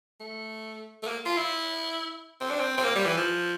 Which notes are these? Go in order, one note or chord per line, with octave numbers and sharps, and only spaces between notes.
A3
A3
A#3
F4
E4
C4
D4
C4
C4
A#3
G3
E3
F3